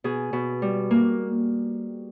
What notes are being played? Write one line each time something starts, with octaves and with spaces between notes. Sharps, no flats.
B2 G#4
B2
G3
A#3